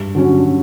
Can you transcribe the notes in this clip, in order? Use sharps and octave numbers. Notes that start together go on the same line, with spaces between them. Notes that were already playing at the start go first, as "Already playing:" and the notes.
Already playing: G2
D3 F#3 C#4